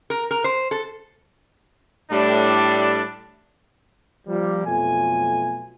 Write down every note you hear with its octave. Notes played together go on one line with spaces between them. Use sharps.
A#4
A#4
C5
A4
A2 G3 D4
F3 G3 A#3
F2 B2 F#3 A3 F4 G#5